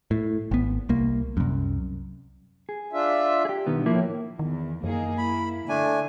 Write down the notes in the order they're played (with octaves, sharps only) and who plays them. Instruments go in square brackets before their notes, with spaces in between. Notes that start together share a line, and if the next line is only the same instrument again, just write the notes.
[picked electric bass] A2
G#1 B3
C2 A#3
C2 F#2
[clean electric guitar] G#4
[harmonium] D4 F4 E5
[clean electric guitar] G4 G#4
[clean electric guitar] B1 D#3 B3 [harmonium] G2
[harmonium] A2 [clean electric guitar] F3 A#3 E4
[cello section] E2 [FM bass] D#3
[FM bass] F#2 [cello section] A#3 D#4 G#4
[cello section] A#3 E4 [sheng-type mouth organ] B5
[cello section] D3 [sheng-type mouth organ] A3 D4 G#5